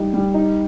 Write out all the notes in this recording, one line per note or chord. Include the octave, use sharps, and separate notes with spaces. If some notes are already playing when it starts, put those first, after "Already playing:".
Already playing: G3 D#4
G3
D#4